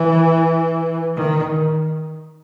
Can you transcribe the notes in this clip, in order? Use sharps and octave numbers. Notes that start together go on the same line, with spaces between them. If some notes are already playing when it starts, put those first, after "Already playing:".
Already playing: E3
D#3